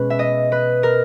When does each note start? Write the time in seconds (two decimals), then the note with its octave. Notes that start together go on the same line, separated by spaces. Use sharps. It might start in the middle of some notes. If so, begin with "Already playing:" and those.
Already playing: B2 G#3 C#4 B4
0.10 E5
0.19 D#5
0.52 B4
0.83 A#4